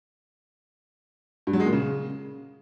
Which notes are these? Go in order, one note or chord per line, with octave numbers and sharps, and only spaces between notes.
G2
F#3
G#3
A#2
C#3